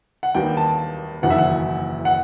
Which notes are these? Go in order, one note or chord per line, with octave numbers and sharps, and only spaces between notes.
F#5
D#2 D#3 G3 B3 G5
A5
F#1 E2 D#3 F#5
E5
F#5
F#5